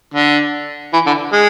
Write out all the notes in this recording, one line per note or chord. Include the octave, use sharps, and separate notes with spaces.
D3
E3
D3
G#3